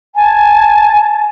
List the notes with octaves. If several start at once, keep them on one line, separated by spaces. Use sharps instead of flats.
G#5 A5